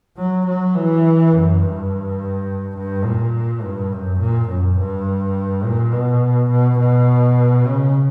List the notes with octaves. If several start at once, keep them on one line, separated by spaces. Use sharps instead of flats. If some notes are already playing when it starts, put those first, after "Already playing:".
F#3
F#3
E3
F#2
G2
G2
A#2
G2
F#2
A#2
F#2
G2
A#2
B2
B2
B2
C#3